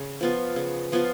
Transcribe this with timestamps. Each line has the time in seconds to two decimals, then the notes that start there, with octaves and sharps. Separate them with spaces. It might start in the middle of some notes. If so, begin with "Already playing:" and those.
Already playing: C#3
0.21 F3 B3 F4
0.56 C#3
0.92 F3 B3 F4